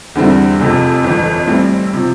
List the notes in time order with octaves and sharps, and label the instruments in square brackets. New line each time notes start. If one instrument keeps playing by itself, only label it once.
[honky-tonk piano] E2 D3 G3 C4 E4
F1 F2 C3 F3
G1 F2 E3
A2 G3 C4 E4
C3 F3